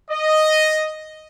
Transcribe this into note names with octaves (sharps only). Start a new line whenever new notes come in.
D#5